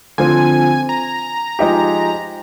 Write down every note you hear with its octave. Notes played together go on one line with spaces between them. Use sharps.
D3 F3 C4 F4 G#5
A#5
F3 G#3 D#4 G4